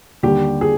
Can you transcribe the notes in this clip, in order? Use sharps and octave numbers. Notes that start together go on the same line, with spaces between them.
D#2 D3 G3 G4
G#4